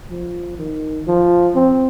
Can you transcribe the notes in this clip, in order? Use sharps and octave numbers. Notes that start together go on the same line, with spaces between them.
F3
D#3
F3
C4